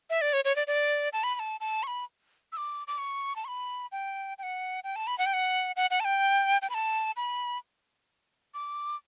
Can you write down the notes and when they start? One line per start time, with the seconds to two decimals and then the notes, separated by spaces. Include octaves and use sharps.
0.10 E5
0.21 D5
0.33 C#5
0.45 C#5
0.56 D5
0.67 D5
1.13 A5
1.24 B5
1.35 B5
1.39 A5
1.60 A5
1.83 C#6
1.87 B5
2.52 E6
2.57 D6
2.87 D6
2.98 C#6
3.36 A5
3.45 C#6
3.48 B5
3.92 G5
4.38 G5
4.43 F#5
4.84 G5
4.96 A5
5.07 B5
5.18 F#5
5.26 G5
5.33 F#5
5.76 F#5
5.90 F#5
6.00 A5
6.05 G5
6.62 G5
6.70 B5
6.74 A5
7.16 B5
8.54 D6